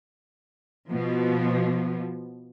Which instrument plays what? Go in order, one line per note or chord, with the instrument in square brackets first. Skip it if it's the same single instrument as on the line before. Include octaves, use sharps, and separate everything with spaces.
[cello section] B2 F3 B3